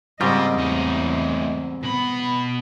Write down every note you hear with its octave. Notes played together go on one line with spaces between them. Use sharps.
G#2 C#3 G3 C4 F4 A#4 D#5
E2 A2 D#4
B2 B3 B5